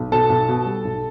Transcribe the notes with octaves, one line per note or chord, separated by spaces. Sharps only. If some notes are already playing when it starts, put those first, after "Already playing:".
Already playing: B1
B2 A4 A5
B1
B2
G3
B1